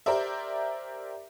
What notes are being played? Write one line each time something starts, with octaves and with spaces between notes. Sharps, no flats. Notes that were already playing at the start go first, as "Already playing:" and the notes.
G4 A#4 C5 D5 E5